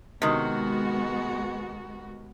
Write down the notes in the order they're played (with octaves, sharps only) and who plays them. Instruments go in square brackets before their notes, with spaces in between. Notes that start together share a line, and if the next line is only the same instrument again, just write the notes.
[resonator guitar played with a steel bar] C3 D#3 [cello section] G#3 B3 F#4